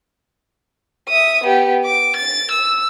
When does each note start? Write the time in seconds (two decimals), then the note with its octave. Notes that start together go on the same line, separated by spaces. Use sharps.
1.09 E5 D#6
1.44 B3 G4
1.85 D6
2.16 A6
2.51 E6